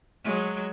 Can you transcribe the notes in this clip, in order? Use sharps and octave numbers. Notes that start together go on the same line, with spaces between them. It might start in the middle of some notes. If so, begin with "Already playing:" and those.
F#3 G#3